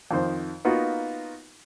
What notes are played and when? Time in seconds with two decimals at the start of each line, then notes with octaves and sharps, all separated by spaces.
0.11 F2 D#3 C5
0.65 A#3 B3 D#4 F4 F#4